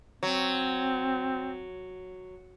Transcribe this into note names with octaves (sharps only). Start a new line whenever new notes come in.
F#3 C4